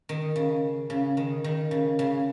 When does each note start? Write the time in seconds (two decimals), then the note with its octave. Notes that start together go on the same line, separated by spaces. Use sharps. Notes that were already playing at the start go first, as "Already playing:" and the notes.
0.09 D#3
0.36 C#3
0.90 C#3
1.17 D#3
1.44 D#3
1.71 C#3
1.99 C#3